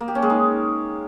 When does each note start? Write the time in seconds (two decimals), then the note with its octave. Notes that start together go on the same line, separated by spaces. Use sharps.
0.01 A#3
0.08 G4
0.15 C#4
0.22 G#3
0.30 D#4